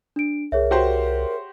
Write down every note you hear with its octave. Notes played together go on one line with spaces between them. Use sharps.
D4 D7
C2 G#4 A#4 C#5 E5
F#4 G4 C5